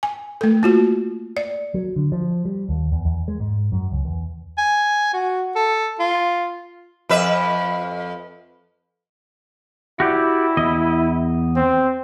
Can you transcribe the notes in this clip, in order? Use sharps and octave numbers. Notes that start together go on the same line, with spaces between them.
G#5
A3 A4
A#3 F4 F#4
D5
F#3
D3
F3
G3
D#2
E2
E2
G#3
G#2
F#2
C#2
E2
G#5
F#4
A4
F4
F2 B4 E5
E4 F#4 G4 D5
E2 D#5
C4